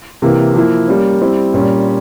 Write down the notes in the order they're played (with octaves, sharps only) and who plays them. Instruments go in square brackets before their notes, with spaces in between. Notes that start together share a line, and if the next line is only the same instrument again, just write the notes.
[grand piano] C3 E3 A#3 E4
F3 A#3 E4
G3 A#3 C#4
G3 C4 E4
A#2 G3 C#4